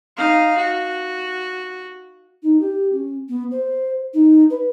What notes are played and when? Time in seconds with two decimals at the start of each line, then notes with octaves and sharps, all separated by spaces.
0.17 D#4 F5
0.57 F#4
2.43 D#4
2.60 G4
2.92 C#4
3.29 B3
3.51 C5
4.14 D#4
4.50 B4